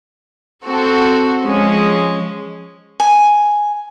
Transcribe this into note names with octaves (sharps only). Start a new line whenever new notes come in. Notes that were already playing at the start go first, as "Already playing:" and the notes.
C4 F#4 A4
F3 G#3 C#4
G#5